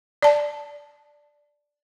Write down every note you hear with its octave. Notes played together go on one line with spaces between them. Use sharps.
D5 A5